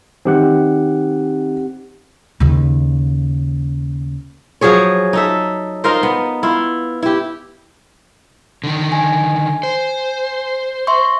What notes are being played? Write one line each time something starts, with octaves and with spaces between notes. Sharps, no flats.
D#3 C4 G4 F#5
D#2 C#3
F3 F#3 G#4 C#5
D#4 A4 E5
D#4 F4 A#4 C5
B3
E4 F4
E4 G4
D3 D#3
G#5
C5
E5 C6 C#6